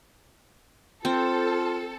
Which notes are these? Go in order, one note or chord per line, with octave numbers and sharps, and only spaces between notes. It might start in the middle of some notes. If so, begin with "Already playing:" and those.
C4 F4 A4